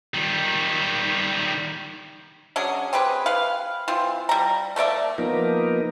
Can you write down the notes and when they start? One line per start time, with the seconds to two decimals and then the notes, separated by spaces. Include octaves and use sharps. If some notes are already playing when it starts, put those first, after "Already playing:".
0.14 D#3 G3
2.56 F#3 C#4 D4 G#4
2.93 C4 G4 G#4 B4
3.26 B4 F5
3.88 E3 C4 F4
4.29 G3 A#5
4.76 A3 A#3 D5 E5
5.18 F3 A#3 B3 D#4 A#4